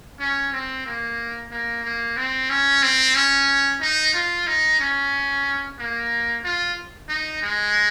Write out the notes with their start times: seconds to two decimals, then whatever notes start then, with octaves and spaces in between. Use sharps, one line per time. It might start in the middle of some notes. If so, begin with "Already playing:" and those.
0.19 C#4
0.53 C4
0.86 A#3
1.51 A#3
1.84 A#3
2.17 C4
2.50 C#4
2.83 C4
3.15 C#4
3.81 D#4
4.14 F4
4.47 D#4
4.80 C#4
5.78 A#3
6.44 F4
7.09 D#4
7.42 G#3